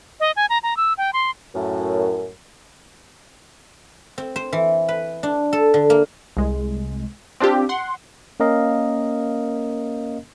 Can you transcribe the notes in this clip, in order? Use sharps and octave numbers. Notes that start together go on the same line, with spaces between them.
D#5
G#5
A#5
A#5
E6
G5
C6
F#2 A2
C4
C5
E3
B4
D4
A4
D3
A#3
C2 G#3
C4 D4 F4 G4
F#5 C6
A#3 C#4 A#4 D#5 F5